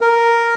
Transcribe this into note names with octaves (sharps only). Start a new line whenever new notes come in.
A#4